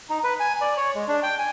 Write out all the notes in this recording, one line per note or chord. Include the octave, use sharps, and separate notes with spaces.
D#4
B4
G#5
D5
C#5
G#3
D4
G5
G#5